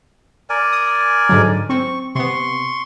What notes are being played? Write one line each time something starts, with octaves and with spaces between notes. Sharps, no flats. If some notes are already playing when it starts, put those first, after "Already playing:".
A#4 D5 G#5
D#6
G#2 D3 F#3
C4 C#6
C3 B3 C6 C#6